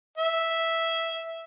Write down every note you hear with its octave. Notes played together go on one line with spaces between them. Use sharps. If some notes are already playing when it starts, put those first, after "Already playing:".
E5